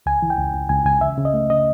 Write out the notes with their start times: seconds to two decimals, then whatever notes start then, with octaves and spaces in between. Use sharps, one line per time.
0.06 C#2 G#5
0.22 E3
0.30 G5
0.38 C#2
0.54 C#2
0.69 C#2 G#5
0.86 C#2 G#5
1.01 C#3 E5
1.17 C#3
1.25 D#5
1.34 A3
1.50 C#3 D#5